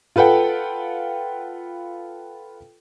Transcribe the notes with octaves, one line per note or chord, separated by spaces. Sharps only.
F4 A4 B4 F#5 G5